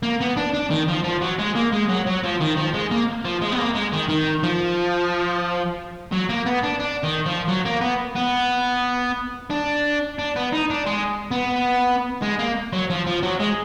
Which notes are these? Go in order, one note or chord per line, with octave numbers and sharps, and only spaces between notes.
A#3
B3
D4
D4
D#3
F3
F3
F#3
G#3
A#3
G#3
F#3
F#3
F3
D#3
F3
G#3
A#3
F3
G#3
B3
A#3
G#3
D#3
D#3
F3
F#3
A#3
B3
D4
D4
D#3
F3
F#3
A#3
B3
B3
D4
D4
B3
D#4
D4
G#3
B3
G#3
A#3
F#3
F3
F3
F#3
G#3